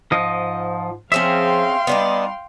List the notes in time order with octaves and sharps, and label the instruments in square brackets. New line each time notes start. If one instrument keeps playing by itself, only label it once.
[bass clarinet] G#2 [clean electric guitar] F3 D#5
[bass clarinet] F3 [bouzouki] C4 C#4 G#4 [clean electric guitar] E5 [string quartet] F5 G5 C6
[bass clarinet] G3 [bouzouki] B3 D4 D#4